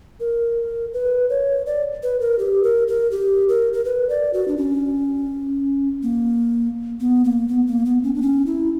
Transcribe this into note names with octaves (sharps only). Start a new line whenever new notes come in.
A#4
B4
C#5
D5
B4
A#4
G4
A#4
A#4
G4
A#4
A#4
B4
D5
F#4
D4
C#4
A#3
B3
A#3
B3
A#3
B3
C#4
D4
C#4
E4